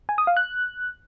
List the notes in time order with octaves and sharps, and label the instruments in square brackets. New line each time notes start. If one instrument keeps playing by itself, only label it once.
[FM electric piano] G#5
D#6
F5
F#6